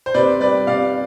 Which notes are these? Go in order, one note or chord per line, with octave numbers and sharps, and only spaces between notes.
C5
C3 B4 D5
G3 B4 D5
C3 D5 F5